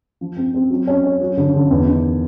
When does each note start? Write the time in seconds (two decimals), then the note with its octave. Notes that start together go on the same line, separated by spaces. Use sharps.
0.21 F3
0.37 C4
0.54 C4
0.70 F#3
0.87 C#4
1.03 C#4
1.21 F#3
1.37 D3
1.54 D3
1.70 E2
1.86 D#3